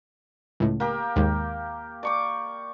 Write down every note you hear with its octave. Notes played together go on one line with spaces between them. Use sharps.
C#2 A2
A#3 G4
D#2 G#2
D5 C#6 D6